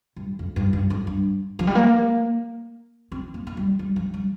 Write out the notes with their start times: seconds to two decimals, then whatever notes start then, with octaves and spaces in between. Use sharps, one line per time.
0.16 G2
0.39 F2
0.56 G2
0.73 G2
0.90 F2
1.07 G2
1.59 F3
1.67 G3
1.75 A#3
3.12 C4
3.34 A#3
3.47 A#3
3.57 G3
3.79 G3
3.96 F3
4.14 G3